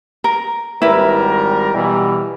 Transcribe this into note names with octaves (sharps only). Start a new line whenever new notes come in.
A#4
G#1 G3 E4 A#4 B4
B2 E3 G3